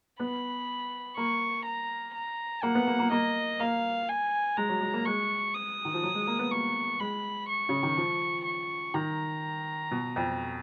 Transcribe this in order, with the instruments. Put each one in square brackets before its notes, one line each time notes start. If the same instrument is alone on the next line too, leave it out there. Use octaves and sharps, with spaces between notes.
[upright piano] B3 [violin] B5
[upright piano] A#3 [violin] C#6
[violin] A#5
A#5
[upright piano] A#3 [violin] F#5
[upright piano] B3
A#3
A#3
[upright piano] A#3 [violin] D#5
[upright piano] A#3 [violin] F5
[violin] G#5
[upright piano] G#3 [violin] A#5
[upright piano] F#3
G#3
A#3
[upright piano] G#3 [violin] C#6
[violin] D#6
[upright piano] D#3
F3
F#3
G#3
A#3
B3
[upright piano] A#3 [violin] C#6
[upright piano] G#3 [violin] B5
[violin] C#6
[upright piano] C#3
D#3
F3
[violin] C#6
[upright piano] D#3 [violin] A#5
[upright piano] B2
F2